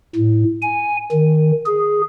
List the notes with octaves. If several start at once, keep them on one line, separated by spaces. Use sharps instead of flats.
A2
G#5
D#3
G#4